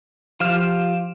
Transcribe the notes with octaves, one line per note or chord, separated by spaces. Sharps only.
F3 F4 G4 F5 F6 E7